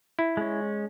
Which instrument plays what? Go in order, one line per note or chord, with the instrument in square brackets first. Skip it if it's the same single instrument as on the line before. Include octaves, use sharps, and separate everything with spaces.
[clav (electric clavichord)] E4
[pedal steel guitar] G#3 C#4